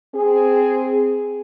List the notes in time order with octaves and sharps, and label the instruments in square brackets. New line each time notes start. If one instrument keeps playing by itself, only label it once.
[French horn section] C4 G#4